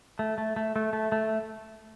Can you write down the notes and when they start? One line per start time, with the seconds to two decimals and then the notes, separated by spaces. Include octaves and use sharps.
0.19 A3
0.38 A3
0.56 A3
0.76 A3
0.93 A3
1.12 A3